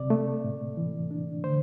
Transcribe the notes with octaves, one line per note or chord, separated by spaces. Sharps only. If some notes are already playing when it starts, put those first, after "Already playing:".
Already playing: C3 D5
A3
A2
E3
D4
D3 C5